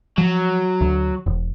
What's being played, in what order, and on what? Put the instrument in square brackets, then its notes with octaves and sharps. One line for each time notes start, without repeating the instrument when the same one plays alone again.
[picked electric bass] F3 [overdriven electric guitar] F#3
[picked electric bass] D2
E1